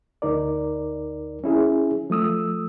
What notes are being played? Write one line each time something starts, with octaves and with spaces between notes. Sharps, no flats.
D2 D#4 A#4 D5
C#4 E4 G#4
F3 A3 D#6 E6